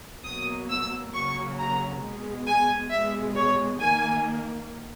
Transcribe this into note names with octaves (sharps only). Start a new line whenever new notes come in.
B2 F#3 A#3 D#6
E6
C#3 F#3 A#3 C#6
A#5
B2 G#3
G#5
B2 G#3 E5
C#5
D#3 A#3 G#5